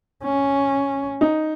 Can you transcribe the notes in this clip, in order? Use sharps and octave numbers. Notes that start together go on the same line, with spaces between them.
C#4
D#4